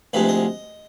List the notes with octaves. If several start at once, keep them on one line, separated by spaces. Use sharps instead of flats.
D2 C3 F3 G#3 B4
D#5